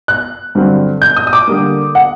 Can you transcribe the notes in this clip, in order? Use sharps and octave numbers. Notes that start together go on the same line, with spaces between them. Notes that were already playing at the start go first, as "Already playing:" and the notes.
F#6
G2 D3 F#3 C4
G6
D#6
D#6
D6
D3 G3 A#3
F#5